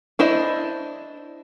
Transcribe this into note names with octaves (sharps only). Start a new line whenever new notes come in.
D4 E4 C5 D#5 E5